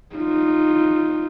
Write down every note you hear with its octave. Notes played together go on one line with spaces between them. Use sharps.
D#4 F4